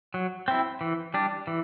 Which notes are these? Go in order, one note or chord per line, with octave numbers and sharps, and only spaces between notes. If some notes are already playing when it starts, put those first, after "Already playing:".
F#3
C4 E4
E3
G3 D4
E3